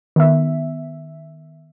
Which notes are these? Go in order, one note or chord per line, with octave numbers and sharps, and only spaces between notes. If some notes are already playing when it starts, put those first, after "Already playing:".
D#3 B3 E5